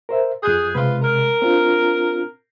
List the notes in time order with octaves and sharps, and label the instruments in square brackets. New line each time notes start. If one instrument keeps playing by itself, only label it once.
[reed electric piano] A#4 C5 E5
[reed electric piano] F2 F#6 G6 [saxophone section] G#4
[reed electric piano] C3 G#3 [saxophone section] F4 B4
[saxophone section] A#4
[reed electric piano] C4 D4 F4